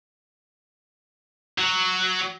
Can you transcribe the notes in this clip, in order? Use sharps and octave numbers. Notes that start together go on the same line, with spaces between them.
F#3